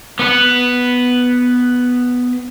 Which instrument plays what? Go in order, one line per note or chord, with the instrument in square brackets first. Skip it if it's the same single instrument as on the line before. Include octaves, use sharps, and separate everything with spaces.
[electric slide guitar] B3 B4